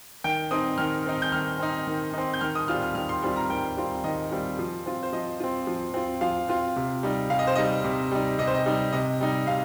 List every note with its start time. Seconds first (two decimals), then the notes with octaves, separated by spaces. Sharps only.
0.24 D#3 G5
0.51 C4 D#4 D#6
0.78 D#3 F6
1.06 C4 D#4
1.22 G6
1.32 D#3 F6
1.59 C4 D#4
1.87 D#3
2.14 C4 D#4
2.34 G6
2.41 D#3 F6
2.55 D#6
2.68 G3 C4 F4 F6
2.82 F6
2.95 D#3 F6
3.09 C6
3.23 G3 C4 F4 C6
3.36 A#5
3.50 D#3 G5
3.77 G3 C4 F4
4.04 D#3 D#5
4.31 G3 C4 F4
4.59 F3
4.86 C4 F4
5.03 C5
5.13 F3 D#5
5.40 C4 F4
5.67 F3
5.94 C4 F4
6.21 F3 F5
6.49 C4 F4
6.76 C3
7.03 G3 D#4
7.30 C3 F5
7.39 D#5
7.47 C5
7.55 G3 D#4 D#5
7.84 C3
8.11 G3 D#4
8.39 C3 D#5
8.47 C5
8.55 D#5
8.66 G3 D#4
8.93 C3 D#5
9.20 G3 D#4
9.47 C3 F5